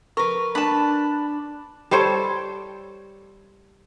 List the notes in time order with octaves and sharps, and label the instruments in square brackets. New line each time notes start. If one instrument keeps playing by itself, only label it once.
[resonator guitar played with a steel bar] A#4 B4 [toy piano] C#6
[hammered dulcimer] D4 [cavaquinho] A5 B5
[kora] G3 A4 C5 C#5